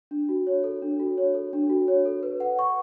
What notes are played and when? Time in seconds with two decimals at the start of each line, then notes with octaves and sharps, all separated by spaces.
0.11 D4
0.29 F#4
0.47 C#5
0.64 A4
0.82 D4
1.00 F#4
1.18 C#5
1.34 A4
1.53 D4
1.70 F#4
1.88 C#5
2.05 A4
2.23 B4
2.40 F#5
2.59 C#6